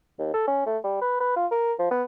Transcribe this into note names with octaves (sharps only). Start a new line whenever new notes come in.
D#2
A4
C#4
A3
G3
B4
B4
F4
A#4
F3
B3